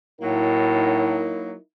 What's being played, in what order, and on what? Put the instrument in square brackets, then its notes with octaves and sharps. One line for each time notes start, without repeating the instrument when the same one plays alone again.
[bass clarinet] A2 [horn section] F#3 A#3 [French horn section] D#4 E4 A#4